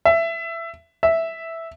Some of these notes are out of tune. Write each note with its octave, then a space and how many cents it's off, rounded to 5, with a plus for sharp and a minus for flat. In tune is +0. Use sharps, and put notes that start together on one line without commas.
E5 +15
E5 -5